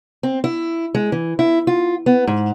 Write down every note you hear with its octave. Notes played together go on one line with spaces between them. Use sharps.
C4
E4
G#3
E3
E4
F4
B3
G#2